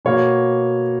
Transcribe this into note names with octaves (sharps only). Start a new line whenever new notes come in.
B2 A#3 C#5